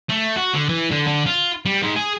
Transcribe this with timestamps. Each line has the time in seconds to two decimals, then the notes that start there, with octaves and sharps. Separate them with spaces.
0.09 A3
0.36 F#4
0.54 D3
0.69 E3
0.91 D3
1.07 D3
1.26 F4
1.66 G3
1.82 G#2
1.96 G#4